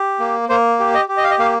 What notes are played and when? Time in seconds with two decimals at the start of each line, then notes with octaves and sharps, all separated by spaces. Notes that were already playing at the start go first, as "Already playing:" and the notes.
Already playing: G4
0.20 A#3
0.49 A#3 C5
0.79 G4
0.94 D#5
1.09 G4
1.17 D#5
1.24 F5
1.31 D#5
1.39 A#3 F5